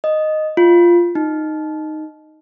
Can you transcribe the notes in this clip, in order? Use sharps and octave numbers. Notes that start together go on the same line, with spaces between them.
D#5
F4
D#4